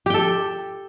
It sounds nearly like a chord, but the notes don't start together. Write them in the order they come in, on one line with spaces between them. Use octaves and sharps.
G4 G5 A4